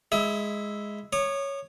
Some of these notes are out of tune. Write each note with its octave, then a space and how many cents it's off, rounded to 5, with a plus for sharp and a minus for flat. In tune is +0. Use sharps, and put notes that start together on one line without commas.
G#3 +0 E4 +0 D#6 +45
C#5 +0 D#6 -40